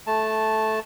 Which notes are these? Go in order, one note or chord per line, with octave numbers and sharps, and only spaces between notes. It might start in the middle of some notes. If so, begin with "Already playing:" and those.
A3 A5